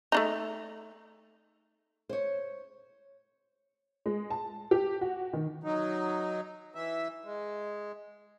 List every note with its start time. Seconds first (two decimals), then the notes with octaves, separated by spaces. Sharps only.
0.12 A3 D4 D#4
2.09 C5 C#5
4.06 G#3
4.30 A5
4.71 G4
5.01 F#4
5.33 D#3
5.64 F#3 D#4
6.75 E3 E5
7.25 G#3